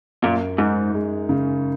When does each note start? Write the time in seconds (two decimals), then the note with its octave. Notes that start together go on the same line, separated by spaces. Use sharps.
0.23 F#2 A#2
0.58 G#2 D#4
0.94 G#3
1.29 C#3